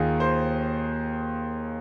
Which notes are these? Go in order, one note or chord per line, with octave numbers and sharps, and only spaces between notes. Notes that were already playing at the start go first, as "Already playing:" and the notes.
Already playing: D#2 D#3 F4 G#4
C5